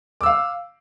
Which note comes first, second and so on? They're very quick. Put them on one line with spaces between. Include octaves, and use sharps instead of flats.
D6 E6 F5